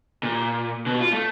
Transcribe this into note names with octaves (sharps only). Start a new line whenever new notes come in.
A#2
B2
F4
A3